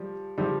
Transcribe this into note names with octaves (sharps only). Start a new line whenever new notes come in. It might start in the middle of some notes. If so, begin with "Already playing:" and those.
Already playing: F3 G3
F3 G3